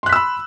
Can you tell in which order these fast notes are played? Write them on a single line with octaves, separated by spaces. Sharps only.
C6 F#6 B6 E6 B5